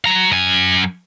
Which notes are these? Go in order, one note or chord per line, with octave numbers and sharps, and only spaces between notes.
F#3 A#5
F#2 G#5